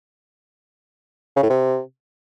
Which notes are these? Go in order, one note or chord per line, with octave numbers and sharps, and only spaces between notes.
C#3
A2
C3